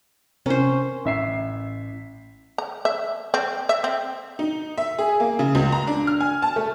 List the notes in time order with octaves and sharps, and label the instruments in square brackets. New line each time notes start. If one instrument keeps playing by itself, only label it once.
[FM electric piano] C3 C4 A#4 [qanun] C#4 C5
[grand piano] A1 E5 C7
[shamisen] A#5
E5
C4
E5
C4
[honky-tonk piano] D#4
E5
G#4
A#3
C#3
C#2
A#5
D4
F6
G#5
A5
A3